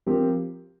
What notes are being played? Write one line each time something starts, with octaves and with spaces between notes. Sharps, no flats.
F3 C4 G4 A#4